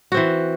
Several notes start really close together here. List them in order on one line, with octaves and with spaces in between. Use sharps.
F#4 C4 E3